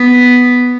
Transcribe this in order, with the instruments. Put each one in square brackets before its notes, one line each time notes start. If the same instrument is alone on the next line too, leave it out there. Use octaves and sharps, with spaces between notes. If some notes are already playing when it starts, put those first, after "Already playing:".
Already playing: [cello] B3